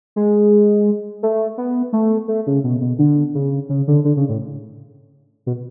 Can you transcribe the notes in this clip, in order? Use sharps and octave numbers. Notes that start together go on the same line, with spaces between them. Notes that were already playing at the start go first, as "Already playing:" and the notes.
G#3
A3
B3
A3
A3
C#3
B2
B2
D3
C#3
C#3
D3
D3
C#3
A2
B2